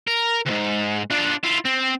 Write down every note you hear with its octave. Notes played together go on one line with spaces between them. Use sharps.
A#4
D2 G#2
D4 F4
E4 F4
C4